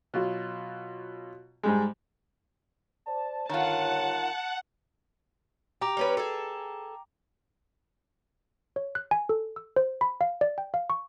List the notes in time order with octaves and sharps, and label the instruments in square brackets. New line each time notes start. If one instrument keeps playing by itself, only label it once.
[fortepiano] B2 F#3 F4
G#2 G3 G#3
[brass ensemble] C5 D5 A5
[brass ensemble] G1 C#5 [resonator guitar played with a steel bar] D#3 F4 [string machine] F#5 [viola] A5
[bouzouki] G4 [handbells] G5 A#5 D6
[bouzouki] G3 C#4 B4
G#4 A4
[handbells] C#5
F#6
G#5
A4
E6
C5
B5
F5
D5
G5
F5
C#6